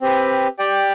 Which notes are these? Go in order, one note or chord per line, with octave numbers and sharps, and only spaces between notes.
C4 G4 B4
G4 D5 G5